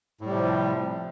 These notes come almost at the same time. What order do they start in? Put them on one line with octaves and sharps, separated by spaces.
A2 G3 C3 F3